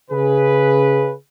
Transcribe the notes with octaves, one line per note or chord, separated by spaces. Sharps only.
C#3 G#4 B4